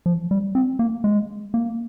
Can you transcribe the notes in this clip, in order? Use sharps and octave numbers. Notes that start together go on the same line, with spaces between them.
F3
G3
C4
A#3
G#3
A#3